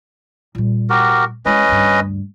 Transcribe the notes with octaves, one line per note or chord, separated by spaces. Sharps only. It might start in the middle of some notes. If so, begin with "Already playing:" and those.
A#2 G3
F#4 G4 A#4
G#3 C#4 E4 B4 D#5
D2 G2